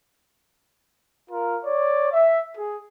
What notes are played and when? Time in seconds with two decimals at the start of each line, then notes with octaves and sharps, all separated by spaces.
1.30 F4 A#4
1.65 C#5 D5
2.11 E5
2.58 G#4